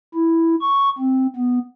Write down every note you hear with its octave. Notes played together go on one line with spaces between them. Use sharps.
E4
C#6
C4
B3